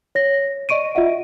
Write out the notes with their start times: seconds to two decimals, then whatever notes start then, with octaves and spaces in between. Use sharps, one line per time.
0.15 C#5 A#6
0.69 D5 D#5 C#6 D7 D#7
0.95 F4 D#5 E5 F#5